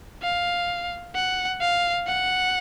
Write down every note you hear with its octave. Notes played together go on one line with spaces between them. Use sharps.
F5
F#5
F5
F#5